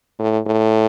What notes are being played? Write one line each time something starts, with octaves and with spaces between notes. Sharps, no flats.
A2
A2